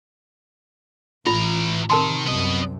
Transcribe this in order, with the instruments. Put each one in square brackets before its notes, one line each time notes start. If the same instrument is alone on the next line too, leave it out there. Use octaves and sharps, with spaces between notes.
[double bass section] A1 [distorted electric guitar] E3 A#5 [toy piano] F4
[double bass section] C3 [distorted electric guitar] D#3 [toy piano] A#4 A5 C6
[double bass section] C2 F#2 C3 [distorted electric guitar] B3 D#5